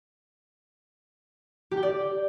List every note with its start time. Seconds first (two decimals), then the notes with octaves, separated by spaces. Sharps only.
1.71 G4
1.77 G5
1.83 D5